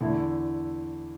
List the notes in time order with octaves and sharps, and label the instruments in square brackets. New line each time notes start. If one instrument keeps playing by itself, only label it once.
[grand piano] E2 D3 A3 E4